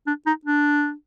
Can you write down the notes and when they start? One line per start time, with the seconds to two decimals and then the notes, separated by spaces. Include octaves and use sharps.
0.07 D4
0.26 D#4
0.45 D4